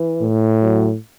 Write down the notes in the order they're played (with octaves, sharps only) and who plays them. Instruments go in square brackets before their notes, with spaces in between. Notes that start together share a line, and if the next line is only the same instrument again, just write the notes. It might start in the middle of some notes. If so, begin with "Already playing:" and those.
Already playing: [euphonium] E3
[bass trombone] A2
[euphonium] F#3